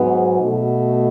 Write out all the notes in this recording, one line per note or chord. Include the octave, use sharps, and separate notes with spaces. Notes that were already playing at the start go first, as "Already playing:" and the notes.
Already playing: G#2 F#3 B3
B2 A3